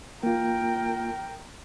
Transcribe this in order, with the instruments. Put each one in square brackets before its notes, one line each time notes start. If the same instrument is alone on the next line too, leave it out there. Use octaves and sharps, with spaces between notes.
[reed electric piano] A#3 F4 [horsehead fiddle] A#4 G5